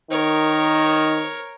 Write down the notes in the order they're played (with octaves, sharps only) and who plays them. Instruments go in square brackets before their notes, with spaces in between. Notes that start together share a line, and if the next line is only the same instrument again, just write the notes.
[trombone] D#3 [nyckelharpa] A#4 C#5